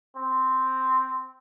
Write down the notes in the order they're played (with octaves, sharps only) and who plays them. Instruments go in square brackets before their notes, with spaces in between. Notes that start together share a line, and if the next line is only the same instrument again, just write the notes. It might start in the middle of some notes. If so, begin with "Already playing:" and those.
[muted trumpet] C4